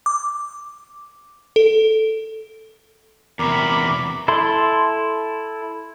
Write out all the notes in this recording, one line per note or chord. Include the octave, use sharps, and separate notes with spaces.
D6
A4
E2 C3 F#4 A#4 B5 D6
E4 A4 C6